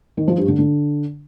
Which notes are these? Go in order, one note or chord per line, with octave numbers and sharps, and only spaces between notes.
D#3
F3
G2
D3
D3